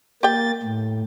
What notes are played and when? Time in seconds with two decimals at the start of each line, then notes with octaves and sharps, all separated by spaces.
0.23 A#3 G4 G5 A6
0.63 A2